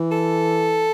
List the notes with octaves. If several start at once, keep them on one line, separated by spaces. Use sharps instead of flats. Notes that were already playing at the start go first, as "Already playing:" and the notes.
Already playing: E3
A4